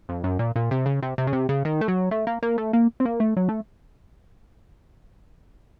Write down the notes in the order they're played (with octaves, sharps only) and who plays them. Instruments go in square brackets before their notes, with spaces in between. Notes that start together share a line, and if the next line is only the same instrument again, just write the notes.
[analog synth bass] F2
F#2
A#2
A#2
C3
C#3
C3
C3
C#3
C3
C#3
D#3
A3
F#3
A3
A#3
A#3
A3
A#3
C4
A#3
A3
F#3
A3